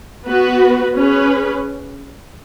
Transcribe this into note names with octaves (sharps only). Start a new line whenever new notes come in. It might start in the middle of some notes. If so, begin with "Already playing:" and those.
B3 F#4 B4
C#4 G#4 B4